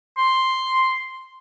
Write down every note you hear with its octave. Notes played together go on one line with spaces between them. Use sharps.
C6